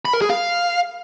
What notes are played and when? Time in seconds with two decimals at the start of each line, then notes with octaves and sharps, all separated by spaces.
0.05 B5
0.13 A#4
0.22 G#4
0.30 F5